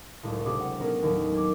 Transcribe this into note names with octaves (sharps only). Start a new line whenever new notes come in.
F#1 C#2 A2
C3 D4 F#4 G#4 D6
F#5
B3 C#4 D4 A4 A#4
D#2 A2 D#3 F#3
D6 G#6